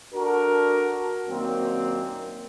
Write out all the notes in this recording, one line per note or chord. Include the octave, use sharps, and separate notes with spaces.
D4 F#4 A4 A#4
F#2 A#2 D#3 A#3 C4